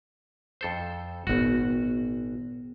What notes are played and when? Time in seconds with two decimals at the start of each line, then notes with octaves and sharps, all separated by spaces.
0.61 F2 A4 C5
1.27 G#1 A#2 B3 F#4